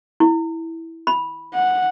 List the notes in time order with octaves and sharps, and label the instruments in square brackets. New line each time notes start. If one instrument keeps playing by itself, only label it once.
[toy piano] E4
B5
[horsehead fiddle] F#5